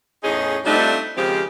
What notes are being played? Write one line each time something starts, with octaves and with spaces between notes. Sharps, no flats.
E2 A2 C#4 D#4 G#4
G3 A3 C4 D4 D#4 F4
D#2 C#3 F3 G#3 C4 G4